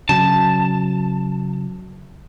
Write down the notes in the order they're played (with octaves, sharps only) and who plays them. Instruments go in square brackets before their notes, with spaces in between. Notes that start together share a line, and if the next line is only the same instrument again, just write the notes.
[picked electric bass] C#3 F#3 [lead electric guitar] A5